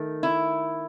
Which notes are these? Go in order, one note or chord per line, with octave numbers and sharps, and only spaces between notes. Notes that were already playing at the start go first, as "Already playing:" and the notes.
Already playing: D#3 A3
E4